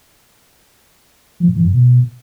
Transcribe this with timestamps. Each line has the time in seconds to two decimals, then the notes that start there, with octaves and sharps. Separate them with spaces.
1.40 F3
1.48 A2
1.56 E3
1.64 F#2
1.73 B2